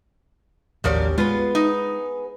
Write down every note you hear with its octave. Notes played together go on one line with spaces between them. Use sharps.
A1 D#2 F3 F#3 C#4 G4 A#4 D5
G#3 B3 F4 G#4 B4
D#4